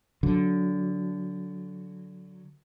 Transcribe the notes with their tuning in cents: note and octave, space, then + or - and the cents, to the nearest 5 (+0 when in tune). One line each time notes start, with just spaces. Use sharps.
D3 -15 F#3 -5